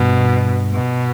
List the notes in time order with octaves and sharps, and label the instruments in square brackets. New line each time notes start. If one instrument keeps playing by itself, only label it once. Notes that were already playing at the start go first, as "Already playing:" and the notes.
Already playing: [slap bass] G2 [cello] B2
[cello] B2